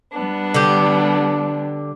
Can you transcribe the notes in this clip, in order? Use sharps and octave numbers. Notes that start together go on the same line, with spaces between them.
G3 B3 D4
D3 G4